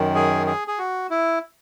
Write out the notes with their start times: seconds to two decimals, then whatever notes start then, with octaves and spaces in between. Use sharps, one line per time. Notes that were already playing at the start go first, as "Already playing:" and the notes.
Already playing: F#2 D#3
0.15 G#4
0.47 G#4
0.68 G#4
0.78 F#4
1.10 E4